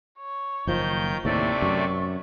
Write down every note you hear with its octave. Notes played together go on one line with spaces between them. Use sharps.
C#5
F#1 D#3 F3 G6
D#2 A2 C3 A3 D5 C#6
F#2